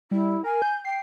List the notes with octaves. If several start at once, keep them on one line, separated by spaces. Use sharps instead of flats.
G3 E4
A#4 G#5
G6
G5 C7